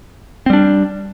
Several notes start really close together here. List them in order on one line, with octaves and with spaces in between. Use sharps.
C4 G3 D4